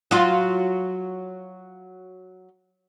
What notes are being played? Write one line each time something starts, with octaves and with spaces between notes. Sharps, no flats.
F#3 F4